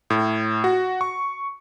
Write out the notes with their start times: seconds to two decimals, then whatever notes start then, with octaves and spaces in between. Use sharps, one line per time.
0.10 A2
0.64 F#4
1.01 C#6